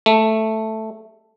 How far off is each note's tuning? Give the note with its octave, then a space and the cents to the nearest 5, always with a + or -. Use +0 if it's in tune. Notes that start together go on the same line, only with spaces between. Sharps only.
A3 +0